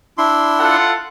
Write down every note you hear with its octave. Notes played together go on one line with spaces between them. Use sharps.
D4 E4 C6
F4 A4 F#5